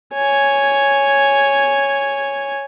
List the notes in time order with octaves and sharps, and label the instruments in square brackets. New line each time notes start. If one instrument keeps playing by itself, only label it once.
[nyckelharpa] C#5 G#5